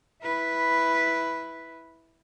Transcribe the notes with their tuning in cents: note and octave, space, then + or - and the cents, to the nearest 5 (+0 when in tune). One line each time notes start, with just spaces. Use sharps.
E4 -5 B4 -5